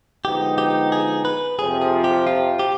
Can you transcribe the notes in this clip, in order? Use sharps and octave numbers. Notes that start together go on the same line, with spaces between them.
D3 F3 G#3 B3 D#4 G4
G4
G#4
B4
F2 C3 F3 C4 G#4
G#4
G4
F4
G4